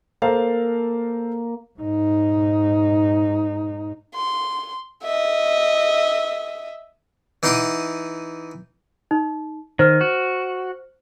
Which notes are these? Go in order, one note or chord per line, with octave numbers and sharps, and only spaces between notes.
A#3 A4 C5 F5
G#2 D#4
C6
D#5 E5
E3 D#4 F#5 C6 D6 D#6
D#4
D#3 C5 F6
F#4